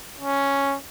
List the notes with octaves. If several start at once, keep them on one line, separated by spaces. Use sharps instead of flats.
C#4